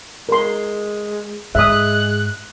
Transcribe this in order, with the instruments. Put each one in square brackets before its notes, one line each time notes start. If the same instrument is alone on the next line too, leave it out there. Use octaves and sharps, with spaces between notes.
[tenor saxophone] G#3 [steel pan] A#4 C6
[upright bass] G#2 [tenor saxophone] G#3 [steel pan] E5 D#6 [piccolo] F#6